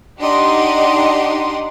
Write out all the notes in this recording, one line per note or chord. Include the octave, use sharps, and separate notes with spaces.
D4 D#4 G4 D#5 F#5 C6